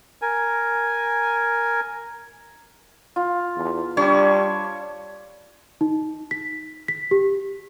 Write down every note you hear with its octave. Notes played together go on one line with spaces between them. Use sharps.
A#4 G#5
F4
E2
G3 D4 C#5
D#4
B6
B6
G4